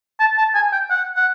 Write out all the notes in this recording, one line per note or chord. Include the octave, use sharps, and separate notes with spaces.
A5
A5
G#5
G5
F#5
F#5